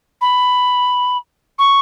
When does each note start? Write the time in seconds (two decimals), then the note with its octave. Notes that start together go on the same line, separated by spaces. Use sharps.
0.21 B5
1.59 C#6